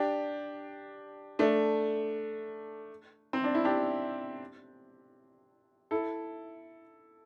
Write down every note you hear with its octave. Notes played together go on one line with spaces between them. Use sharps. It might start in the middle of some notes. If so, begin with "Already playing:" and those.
Already playing: D4 G4
A3 D4
C4
D4
E4
D4 G4
E4 A4